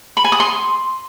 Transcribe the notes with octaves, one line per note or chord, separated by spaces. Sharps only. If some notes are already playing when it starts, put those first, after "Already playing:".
B5
G#5
D#6
C6